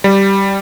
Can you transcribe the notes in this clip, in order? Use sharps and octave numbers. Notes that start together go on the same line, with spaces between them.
G3